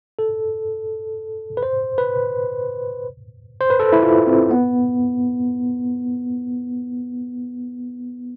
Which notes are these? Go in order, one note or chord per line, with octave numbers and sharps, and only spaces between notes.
A4
B4
C5
B4
C5
B4
A4
E4
F4
C4
B3